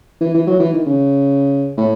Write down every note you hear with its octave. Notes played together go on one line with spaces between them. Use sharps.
E3
E3
F#3
E3
D#3
C#3
A2